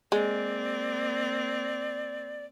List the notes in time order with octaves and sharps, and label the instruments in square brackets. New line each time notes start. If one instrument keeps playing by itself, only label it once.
[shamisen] G#3 [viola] A#3 C4 [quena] D5